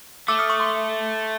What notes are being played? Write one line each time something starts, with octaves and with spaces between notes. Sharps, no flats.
A3 D6 E6
D#6 F6
C#6 D#6
C6 D6